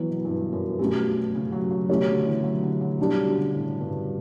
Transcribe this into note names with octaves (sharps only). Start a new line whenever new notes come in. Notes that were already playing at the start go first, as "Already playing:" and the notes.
Already playing: E3 F#3 B3 E4
B2
G2
F#2
G2 B2 F#3 A3 C#4 G4
C#3
F#3
F#3
B2 E3 A3 C#4 G4 C#5
D3
E3
F#3
D3
F#3
B2 D3 G3 D4 G4
D3
C#3
A2
G2